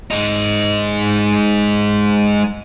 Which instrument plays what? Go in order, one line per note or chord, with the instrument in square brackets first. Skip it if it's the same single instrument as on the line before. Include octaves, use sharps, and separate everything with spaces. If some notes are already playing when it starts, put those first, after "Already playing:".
[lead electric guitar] G#3 D#4